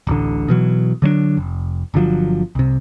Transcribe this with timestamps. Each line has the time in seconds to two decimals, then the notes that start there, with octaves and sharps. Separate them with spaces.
0.07 D1 A1 D3
0.48 B2 E3 F#3
1.02 D3 F#3 A3 D4
1.37 F1
1.94 G1 D3 F3 F#3
2.55 C2 C3